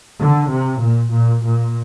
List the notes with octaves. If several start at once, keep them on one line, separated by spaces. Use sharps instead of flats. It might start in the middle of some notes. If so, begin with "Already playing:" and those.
D3
C3
A#2
A#2
A#2